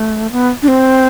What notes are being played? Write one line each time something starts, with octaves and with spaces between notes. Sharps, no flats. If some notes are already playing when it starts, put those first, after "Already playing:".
Already playing: A3
B3
D4
C4